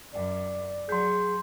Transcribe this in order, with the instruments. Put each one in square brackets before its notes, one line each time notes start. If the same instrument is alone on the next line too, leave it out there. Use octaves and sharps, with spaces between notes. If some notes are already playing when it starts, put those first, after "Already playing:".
[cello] F#2 [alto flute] D5
[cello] F#3 [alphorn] G#4 [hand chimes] C6 G6